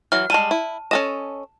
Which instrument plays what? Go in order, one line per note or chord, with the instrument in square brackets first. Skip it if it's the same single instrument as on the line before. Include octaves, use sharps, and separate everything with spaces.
[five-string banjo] E3 F#3 [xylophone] F6
[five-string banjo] G3 G#3 [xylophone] A5 D#7
[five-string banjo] E4
[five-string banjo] C#4 A4 D#5 [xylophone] E7